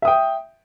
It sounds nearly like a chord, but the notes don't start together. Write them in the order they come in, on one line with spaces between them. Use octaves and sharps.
E5 D#6 G5